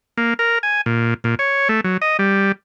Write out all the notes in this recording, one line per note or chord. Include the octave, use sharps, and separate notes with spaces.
A#3
A#4
G#5
A#2
A#2
C#5
A3
F#3
D#5
G3